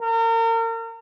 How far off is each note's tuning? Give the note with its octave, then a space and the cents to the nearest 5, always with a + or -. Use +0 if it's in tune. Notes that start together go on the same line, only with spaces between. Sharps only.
A#4 -35